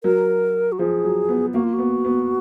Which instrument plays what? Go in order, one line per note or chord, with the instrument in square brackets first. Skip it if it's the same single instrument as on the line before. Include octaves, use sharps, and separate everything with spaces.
[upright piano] F#3 [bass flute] A#4
[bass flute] F#4
[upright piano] F3 [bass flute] G#4
[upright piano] F#3
B3
[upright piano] A#3 [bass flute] F#4
[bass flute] F4
F#4
[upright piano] B3
B3